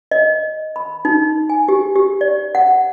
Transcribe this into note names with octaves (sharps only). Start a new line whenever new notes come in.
D#5
B5
D#4
G#5
G4
G4
D5
F#5